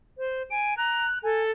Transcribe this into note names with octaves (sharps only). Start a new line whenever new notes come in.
C5
G#5 D7
A#5 F#6
A4 G#5